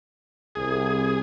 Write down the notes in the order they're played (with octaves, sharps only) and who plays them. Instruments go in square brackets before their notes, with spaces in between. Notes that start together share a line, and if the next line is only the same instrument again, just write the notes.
[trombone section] C2 [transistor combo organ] G#4